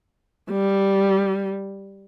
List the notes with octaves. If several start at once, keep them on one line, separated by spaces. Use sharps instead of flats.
G3